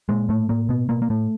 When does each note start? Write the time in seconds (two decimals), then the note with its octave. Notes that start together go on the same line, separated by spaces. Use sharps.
0.09 A#2 G#3
0.29 A2 A3
0.49 A2 A#3
0.69 B2 B3
0.89 B2 A#3
1.02 A#3
1.10 A2 A3